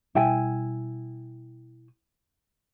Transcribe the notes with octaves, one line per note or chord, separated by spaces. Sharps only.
B2 G3 E4 G5 G#5